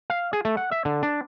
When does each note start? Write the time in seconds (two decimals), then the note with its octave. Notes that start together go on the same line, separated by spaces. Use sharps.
0.10 F5
0.33 G#4
0.45 A3
0.57 F#5
0.71 E5
0.85 D3
1.03 D4